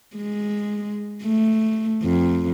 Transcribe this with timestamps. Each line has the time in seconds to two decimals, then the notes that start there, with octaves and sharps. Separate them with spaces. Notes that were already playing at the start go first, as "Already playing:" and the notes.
0.16 G#3
1.23 A3
2.03 F2